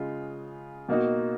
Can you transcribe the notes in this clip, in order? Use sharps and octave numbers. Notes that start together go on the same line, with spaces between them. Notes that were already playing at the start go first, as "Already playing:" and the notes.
Already playing: C#3 G#3 F4
B2 A#3 D#4 F#4